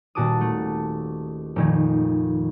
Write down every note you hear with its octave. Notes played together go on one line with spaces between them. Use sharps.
D#1 A#2 F#4 A5 D6 D#6
A3
F1 A#2 D#3 G#6